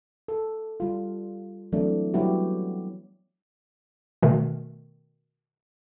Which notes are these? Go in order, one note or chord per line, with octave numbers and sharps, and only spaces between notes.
A4
G3 F4
E3 F#3 A3 C4 D4
F#3 G3 B3 E4 F#4 G4
B2 D#3 A3